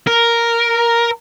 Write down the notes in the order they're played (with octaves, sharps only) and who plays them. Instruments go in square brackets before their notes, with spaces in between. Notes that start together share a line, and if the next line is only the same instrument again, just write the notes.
[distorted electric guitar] A#4